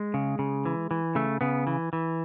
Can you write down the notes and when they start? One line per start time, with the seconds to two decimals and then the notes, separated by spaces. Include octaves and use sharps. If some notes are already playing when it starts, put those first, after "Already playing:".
Already playing: G#3
0.14 C#3
0.39 C#3
0.65 E3
0.91 E3
1.15 C#3 A3
1.41 C#3 B3
1.67 E3
1.93 E3